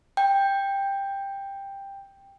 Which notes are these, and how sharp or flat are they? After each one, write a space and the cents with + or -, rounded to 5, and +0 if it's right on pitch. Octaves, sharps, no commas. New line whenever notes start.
G5 +10